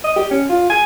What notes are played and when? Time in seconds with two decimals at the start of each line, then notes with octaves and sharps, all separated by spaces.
0.04 D#5
0.16 G4
0.31 C#4
0.49 F4
0.70 G#5